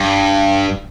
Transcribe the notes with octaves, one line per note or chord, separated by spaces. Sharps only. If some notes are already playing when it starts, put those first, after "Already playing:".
Already playing: G2